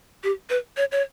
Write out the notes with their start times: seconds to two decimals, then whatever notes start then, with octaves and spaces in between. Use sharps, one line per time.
0.23 G4
0.50 B4
0.77 C#5
0.92 C#5